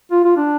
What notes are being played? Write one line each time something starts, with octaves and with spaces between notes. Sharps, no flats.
F4
F4
D4